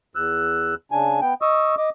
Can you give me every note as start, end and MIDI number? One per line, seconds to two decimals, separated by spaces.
0.15 0.75 40
0.15 0.75 88
0.15 0.75 90
0.92 1.20 49
0.92 1.20 62
0.92 1.20 80
1.21 1.34 59
1.21 1.34 79
1.42 1.75 75
1.42 1.75 85
1.42 1.75 87
1.42 1.75 88
1.78 1.90 75
1.78 1.90 86